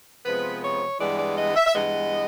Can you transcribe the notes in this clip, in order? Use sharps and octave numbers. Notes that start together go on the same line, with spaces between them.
C3 F3 G#3 B3 B4
C#5
G2 E3 G#3 B3 D5
D5
D#5
E5
E5
G2 E3 G#3 B3 D#5